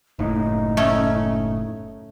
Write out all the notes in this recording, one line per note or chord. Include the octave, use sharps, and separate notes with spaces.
F#1 A2 D#4
A3 C#4